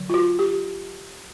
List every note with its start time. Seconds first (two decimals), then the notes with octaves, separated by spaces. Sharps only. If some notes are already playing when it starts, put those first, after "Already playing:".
Already playing: D3 F#3
0.10 F4
0.14 F#4
0.39 G4